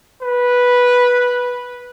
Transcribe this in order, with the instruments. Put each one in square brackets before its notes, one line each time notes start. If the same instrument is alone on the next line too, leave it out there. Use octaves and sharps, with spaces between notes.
[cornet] B4